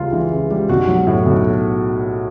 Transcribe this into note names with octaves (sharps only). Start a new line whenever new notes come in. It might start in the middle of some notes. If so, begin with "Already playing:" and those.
Already playing: C#2 C#3 E3 G3 F4
E3
C#3
G3
B1 F#4
F#3
A2
B1